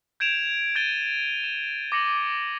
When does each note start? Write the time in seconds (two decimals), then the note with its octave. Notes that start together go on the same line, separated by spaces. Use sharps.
0.20 G6 G#6 D7 E7 F7
0.75 G6 A6 D#7 G7
1.44 E7
1.92 D6 A#6 C#7 F#7